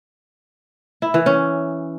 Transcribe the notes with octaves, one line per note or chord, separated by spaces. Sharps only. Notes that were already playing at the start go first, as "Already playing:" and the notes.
E4
E3
C#4